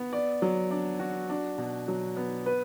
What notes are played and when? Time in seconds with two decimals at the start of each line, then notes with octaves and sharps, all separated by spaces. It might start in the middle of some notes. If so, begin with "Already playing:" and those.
Already playing: B3
0.13 D5
0.42 F#3
0.71 D4
1.00 F#4
1.29 D4
1.58 B2
1.88 F#3
2.17 B3
2.46 B4